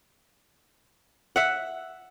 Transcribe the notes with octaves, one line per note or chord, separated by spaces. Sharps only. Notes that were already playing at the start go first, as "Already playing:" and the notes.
E5 F#5